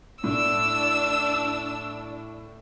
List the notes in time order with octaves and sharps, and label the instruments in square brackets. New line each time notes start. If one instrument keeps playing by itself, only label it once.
[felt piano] A2 [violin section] D4 [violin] E6